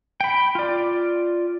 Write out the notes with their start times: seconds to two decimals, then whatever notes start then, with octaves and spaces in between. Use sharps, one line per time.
0.21 G5 B5
0.55 F4 D5